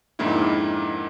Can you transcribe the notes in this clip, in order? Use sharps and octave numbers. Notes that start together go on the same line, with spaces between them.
F2 G#2 D#3 A#3 D4 E4